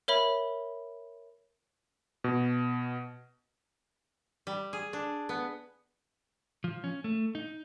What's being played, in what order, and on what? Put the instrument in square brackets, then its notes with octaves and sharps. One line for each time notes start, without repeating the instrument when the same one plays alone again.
[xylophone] A#4 C#5 E5 B5
[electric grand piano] B2
[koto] G3
G#4
D4
B3
[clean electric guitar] F3
C#4
A3
D#4